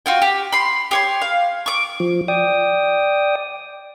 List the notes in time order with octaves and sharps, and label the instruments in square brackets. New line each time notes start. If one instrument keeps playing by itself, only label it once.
[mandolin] F4 F#4 G5
G4
B5 C6
G4 C#5 C6
F5
C#6 D6
[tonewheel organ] F3
D5 G5 D#6